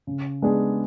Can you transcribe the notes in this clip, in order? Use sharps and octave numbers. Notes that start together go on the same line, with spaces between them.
C#3
G#3 B3 D4 G#4